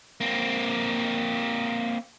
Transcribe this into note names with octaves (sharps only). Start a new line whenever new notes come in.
A#3 C4